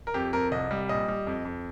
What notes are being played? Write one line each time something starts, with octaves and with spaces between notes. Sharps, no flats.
A#4
F2 G4
F2 A#4
C2 D#5
G3
A#1 D#5
G3
F2
F2